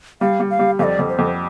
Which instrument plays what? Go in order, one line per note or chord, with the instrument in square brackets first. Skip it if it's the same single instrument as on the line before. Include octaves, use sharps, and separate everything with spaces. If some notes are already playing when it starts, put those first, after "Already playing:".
[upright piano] G3 [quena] F5
[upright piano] G3
[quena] F5
[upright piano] G3
[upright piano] F2 [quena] D5 F5
[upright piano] F2
[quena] C5
[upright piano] F2